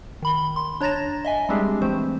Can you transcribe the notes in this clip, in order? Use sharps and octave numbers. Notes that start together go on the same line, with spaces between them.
D#3 B5 G7
C6
D4 C#5 A#5 A6 A#6 E7
D#5 E5 G#5
G3 G#3 C4 D4 G4 G#4
E3 A3 C4 C5